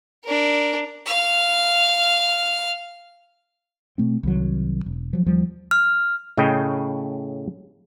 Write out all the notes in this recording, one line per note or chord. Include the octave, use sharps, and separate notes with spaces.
D4 A#4
F5 F6
B2 A3 C4
C2 D#3 F#3
E1
F3 F#3
D#2 F3 G3
F6
A2 C#3 D#5 G5